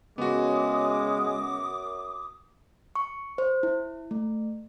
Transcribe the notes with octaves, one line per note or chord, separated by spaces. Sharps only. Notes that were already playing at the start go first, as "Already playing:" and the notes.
F#2 C#3 G#3 B3 F#4 D6 D#6
C#6
C5
E4
A3